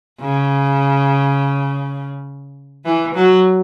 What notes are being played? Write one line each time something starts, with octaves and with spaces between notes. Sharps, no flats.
C#3
E3
F#3